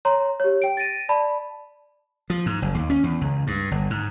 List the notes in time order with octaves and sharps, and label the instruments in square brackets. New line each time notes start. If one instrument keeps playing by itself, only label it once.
[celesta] C#5 A#5 C6
G4 C#5
G5 D7
A6 A#6 D7 D#7
D5 A5 B5
[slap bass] F3
G#2
F#1
D#2
C#4
E2
C#2
G2
G1
G#2